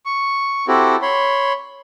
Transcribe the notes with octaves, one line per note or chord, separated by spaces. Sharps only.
C#6
C4 E4 F#4 G4 A4
C#5 B5 C6